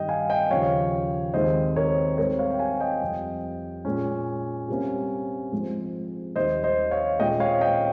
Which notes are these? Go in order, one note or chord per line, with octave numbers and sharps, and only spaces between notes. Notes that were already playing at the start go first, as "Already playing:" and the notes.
Already playing: G2 D#3 G3 D#5 G5
F5 G#5
D#5 G5
D#2 C#3 F3 C#5 F5
D#2 D#3 G#3 C4 C5 D#5
A#4 C#5
G#2 G3 C4 A#4 C#5
C#5 F5
G5
F5 G#5
D#5 G5
F2 C3 G3
A#2 G#3 C#4
C3 G3 A#3 C#4
G#2 F3 G#3 C4
D#2 D#3 G3 C5 D#5
C5 D#5
C#5 F5
A#2 G#3 C#4 D#5 G5
C#5 F5
D#5 G5